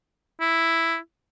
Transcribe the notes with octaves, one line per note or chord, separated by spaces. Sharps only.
E4